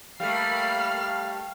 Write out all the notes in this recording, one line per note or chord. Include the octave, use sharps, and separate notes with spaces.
G3 A3 A#3 F5 B5 F6 C7